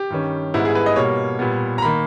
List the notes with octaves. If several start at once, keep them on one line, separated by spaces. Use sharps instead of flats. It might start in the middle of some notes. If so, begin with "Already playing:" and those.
Already playing: G4
G2 D#3 G3 C#4
G#2 G3 B3 E4
G#4
B4
D#5
B2 G3 A#3 C#5
A#2 G3 B3
A#5
D#3 A#3 B5